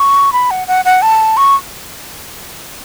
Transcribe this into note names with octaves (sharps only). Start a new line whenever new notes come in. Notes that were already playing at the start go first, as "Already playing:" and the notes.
Already playing: C#6
B5
F#5
F#5
F#5
A5
C#6